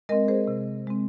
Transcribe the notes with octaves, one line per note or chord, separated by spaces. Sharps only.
G#3 C4 A#4 D#5
G#4 C5
C3
G#3 C4